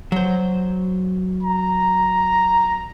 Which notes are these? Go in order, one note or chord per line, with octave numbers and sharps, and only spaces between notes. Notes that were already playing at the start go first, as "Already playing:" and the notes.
F#3 C5
A#5